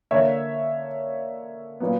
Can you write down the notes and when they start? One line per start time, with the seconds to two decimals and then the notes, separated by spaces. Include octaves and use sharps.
0.11 D3 A#3 C#5 E5
1.80 A#2 F#3 B3